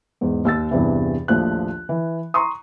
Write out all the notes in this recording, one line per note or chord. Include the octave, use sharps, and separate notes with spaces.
E2 G#2
D#2 E6 A6
E2 G2 C3 E3
A#1 D#2 A2 F3 F#6
E3
A#5 C6 C#6 D#6